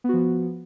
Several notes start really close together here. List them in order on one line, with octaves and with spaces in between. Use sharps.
B3 F#4 F3